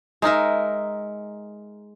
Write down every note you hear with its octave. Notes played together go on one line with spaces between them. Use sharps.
G#3 D#4 A#4 E5